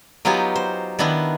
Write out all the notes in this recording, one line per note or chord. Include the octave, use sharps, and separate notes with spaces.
F#3 B3 D#4 F4 G4 G#5
C5
D#3 B3 D4 E4